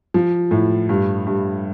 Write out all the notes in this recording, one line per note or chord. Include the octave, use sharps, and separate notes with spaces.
F3
A2
G2
G2